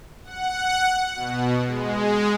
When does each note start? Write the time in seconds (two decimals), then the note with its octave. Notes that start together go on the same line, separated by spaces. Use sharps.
0.24 F#5
1.15 B2
1.67 G#3